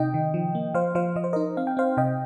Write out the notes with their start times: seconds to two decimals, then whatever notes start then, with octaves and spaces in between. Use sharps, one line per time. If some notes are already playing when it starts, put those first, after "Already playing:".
Already playing: C3 D#4 D#5 G5
0.14 D#3
0.34 F3
0.55 A#3
0.74 F3 C5 F5
0.95 F3 C5 F5
1.16 F3 D#5
1.24 C5
1.33 D#4 A#4 D#5
1.57 C4 F5
1.67 G5
1.77 C4 C5 F5
1.97 C3 D#5 G5